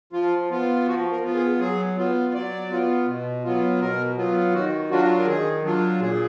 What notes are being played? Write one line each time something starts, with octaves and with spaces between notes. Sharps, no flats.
F3 F4
B3 F4
F3 F#4
A#4
B3 F4
G#4
F#3 G#4
B3 F4
F#3 D5
B3 F4
B2
F#3 B3 F4
B2 A#4
F#3 B3 F4
D#3 F#4
F#3 D4 F4 F#4
A#4
D#3 G#4
F#3 D4 F4
A#2 G#4